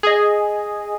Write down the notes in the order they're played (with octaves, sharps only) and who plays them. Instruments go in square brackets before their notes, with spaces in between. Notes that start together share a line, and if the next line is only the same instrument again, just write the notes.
[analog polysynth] G#4 D#5